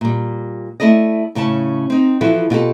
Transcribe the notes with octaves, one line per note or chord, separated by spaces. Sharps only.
A#2 G3
A3 E4 A4 D5 D#5
A2 C#3 C#4 A5
C4 D#4
E3 F3 E4 F#4 A4
B2 F4 G4 A4